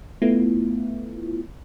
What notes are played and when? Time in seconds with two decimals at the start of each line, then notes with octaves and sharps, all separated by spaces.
0.22 A3 B3 E4 F4